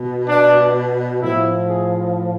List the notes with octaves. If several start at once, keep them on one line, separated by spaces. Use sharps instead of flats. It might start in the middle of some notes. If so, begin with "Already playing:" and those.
Already playing: B2
D4
A2 F3 E4
G#4